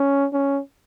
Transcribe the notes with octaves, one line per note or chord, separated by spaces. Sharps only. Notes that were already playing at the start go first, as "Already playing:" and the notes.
Already playing: C#4
C#4